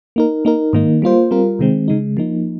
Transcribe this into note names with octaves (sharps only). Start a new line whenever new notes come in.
A#3 D#4 A#4
A#3 D#4 A#4
G#2 D#3 A#3 D#4
G3 A#3 F4 C5
G3 C4 F4 A#4
C3 D#3 G#3 C4
C#3 G#3 D#4
F3 A#3 D#4